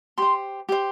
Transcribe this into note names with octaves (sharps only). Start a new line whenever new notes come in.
G4 C5 C6
G4 C5